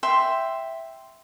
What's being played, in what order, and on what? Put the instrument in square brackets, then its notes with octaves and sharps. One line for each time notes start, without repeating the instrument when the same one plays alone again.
[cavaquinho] E5 G5 C6